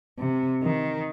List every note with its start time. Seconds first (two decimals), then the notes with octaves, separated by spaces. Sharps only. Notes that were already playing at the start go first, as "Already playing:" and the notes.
0.19 C3
0.63 D#3